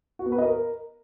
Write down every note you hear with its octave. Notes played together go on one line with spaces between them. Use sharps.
F#4
B3
B4
D#5
A#4